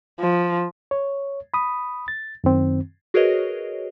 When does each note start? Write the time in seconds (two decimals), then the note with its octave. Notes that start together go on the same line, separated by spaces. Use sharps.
0.20 F3
0.91 C#5
1.54 B5 D#6
2.08 A6
2.44 F#2 D#3 C4
3.14 F#4 G#4 A#4 B4 C#5 D#5